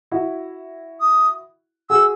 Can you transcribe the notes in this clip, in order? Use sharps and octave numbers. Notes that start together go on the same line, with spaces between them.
E4 F#4
D#6
F#4 G#4 E6